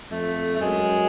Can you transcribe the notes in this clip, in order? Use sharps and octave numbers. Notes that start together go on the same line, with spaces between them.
F2 A3
A3
F#2 G#3